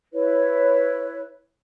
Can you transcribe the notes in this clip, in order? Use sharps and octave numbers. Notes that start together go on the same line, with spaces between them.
E4 B4 C#5